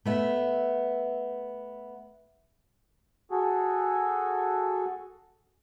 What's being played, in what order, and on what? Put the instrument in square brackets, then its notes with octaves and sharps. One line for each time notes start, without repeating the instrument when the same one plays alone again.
[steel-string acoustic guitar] A3 B3 E5
[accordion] F#4 G#4 A4